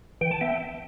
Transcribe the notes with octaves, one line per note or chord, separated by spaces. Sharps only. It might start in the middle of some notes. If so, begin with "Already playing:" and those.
E3 G5
A5
B3 E5 G5